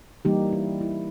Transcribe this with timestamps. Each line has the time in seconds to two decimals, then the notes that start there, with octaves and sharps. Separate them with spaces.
0.25 E3 G3 A#3 D#4 G4
0.53 E4
0.81 E4